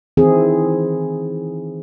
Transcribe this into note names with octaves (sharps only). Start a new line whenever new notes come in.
D#3 E3 C4 E4 G#4